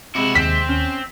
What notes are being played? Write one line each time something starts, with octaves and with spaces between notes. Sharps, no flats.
C3 G#3 E4 F#4
D#2 C4 B6
C#4